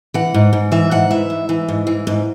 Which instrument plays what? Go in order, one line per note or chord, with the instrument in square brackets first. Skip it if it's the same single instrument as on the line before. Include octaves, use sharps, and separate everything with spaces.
[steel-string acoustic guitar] E3 F#5
G#2
G#2
E3 E5
G#2 F#5
E3 E5
G#2
E3
G#2
E3
G#2